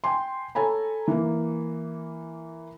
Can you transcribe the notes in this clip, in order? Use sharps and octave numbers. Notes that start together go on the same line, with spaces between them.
G5 G#5 C6
A4 C#5 G#5 A#5 B5
E3 A#3